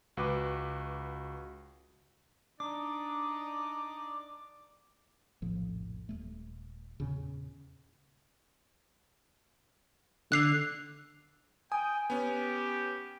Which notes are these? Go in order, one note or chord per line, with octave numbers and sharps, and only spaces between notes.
C#2 F#4 B4 D6
D4 D#4 D5 D6
F1 A#1 A2 F3
D#1 A3
E2 A#2 C#3
D3 F#6 C7 F7
G5 G#5 D#6
B3 C#4 G4